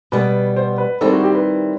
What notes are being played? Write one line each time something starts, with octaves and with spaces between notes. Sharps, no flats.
B2 G3 B3 B4
C5
B4
D#3 G3 C4 E4 A4
F#4
G4
B4